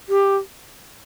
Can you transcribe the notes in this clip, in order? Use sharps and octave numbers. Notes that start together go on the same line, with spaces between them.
G4